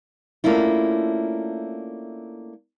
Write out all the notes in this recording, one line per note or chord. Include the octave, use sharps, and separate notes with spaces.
A3 A#3 C#4 D4 E4 F4